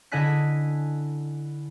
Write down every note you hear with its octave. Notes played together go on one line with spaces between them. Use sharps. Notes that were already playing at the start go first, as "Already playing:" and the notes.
D3 E4 D#5 G#5 F#6 B6